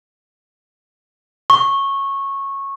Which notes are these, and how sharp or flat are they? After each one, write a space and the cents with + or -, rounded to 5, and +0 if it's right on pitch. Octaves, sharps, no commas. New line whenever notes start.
C#6 -15